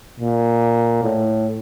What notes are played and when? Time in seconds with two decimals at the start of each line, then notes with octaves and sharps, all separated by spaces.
0.20 A#2
1.03 A2